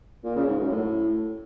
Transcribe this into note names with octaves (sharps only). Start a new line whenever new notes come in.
A#2
C#3
G#2
F#2
A2